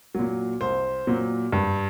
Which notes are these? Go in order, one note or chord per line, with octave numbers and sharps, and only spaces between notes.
A#2 F#3
C2 C5
A#2 F#3
G2